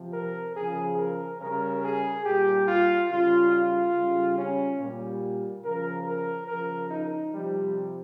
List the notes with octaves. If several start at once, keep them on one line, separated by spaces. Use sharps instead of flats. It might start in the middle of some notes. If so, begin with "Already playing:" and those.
Already playing: C3 F3
A#4
C#3 F3 G#4
A#4
C#3 G3 A#4
G#4
A#2 G4
G3
F4
C#3 G3 F4
F4
C#3 G3
C#4
A#2 G3
C#3 F3 A#4
A#4
C#3 F3 A#4
D#4
C3 F3 G3